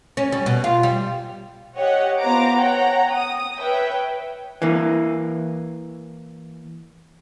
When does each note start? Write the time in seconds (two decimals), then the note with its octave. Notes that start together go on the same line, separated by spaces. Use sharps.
0.17 C#4
0.32 G3
0.46 B2
0.64 F4
0.83 G3
1.77 G4 C#5 D#5 F#5
2.19 B3 F4 C5 A#5 D6 D7
2.57 C#5 F#5 G5 A#5
3.13 D#6
3.58 B4 C#5 E5 G5
4.62 E3 A#3